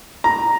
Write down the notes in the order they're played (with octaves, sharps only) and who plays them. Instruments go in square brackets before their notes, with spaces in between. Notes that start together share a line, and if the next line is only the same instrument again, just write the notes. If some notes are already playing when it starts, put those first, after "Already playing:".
[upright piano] A#5